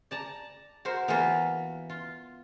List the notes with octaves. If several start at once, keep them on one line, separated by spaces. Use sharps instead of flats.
D5 A5 A#5
F#4 A#4 C5 E5
E3 A#3 B3 F4 A#4 B4
F4